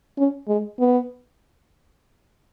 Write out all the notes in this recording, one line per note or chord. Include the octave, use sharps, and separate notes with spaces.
C#4
G#3
B3